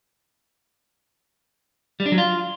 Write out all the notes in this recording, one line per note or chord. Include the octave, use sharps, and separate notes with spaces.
G3
D4
F#3
F4